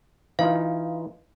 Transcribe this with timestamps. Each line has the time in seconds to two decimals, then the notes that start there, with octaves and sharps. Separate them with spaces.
0.39 E3 D#4 F4 F5